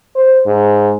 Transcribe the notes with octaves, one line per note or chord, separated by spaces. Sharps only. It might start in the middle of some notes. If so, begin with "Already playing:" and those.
C5
G#2